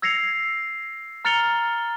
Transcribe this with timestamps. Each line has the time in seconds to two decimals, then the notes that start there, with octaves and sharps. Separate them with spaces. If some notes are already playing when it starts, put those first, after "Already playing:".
0.02 E6 G#6 A#6 C7 C#7 F7
1.25 A#5 F6 A6 C#7 F7 G7